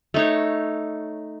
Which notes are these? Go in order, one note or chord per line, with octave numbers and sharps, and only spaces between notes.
A3 D#4 C#5